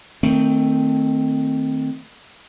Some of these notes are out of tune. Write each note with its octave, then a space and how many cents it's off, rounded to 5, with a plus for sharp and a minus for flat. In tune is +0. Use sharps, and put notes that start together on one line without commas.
D#3 +0 A3 +25 C4 +0